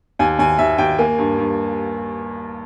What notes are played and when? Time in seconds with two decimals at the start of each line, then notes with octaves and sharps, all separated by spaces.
0.19 D#2 G#5
0.39 D#2 G#5
0.58 D#2 E5
0.78 D#2 G5
0.98 A#3 G#5
1.18 G2
1.38 G2